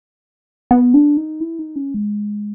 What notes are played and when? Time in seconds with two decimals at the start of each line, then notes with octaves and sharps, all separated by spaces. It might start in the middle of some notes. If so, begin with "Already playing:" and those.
0.71 B3
0.94 D4
1.17 D#4
1.40 E4
1.59 D#4
1.76 C#4
1.94 G#3